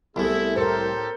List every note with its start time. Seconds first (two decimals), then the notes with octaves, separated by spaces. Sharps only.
0.16 C2 A3 B3 E4 G#4
0.56 A2 G4 A4 A#4 C5